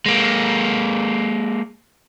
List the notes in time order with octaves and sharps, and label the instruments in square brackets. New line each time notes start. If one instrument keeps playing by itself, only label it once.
[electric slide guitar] G#3 A#3